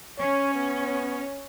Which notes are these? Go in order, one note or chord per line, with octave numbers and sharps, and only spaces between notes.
C#4 C#5
B3